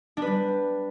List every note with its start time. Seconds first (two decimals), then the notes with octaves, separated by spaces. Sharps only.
0.17 D4
0.22 B4
0.27 G3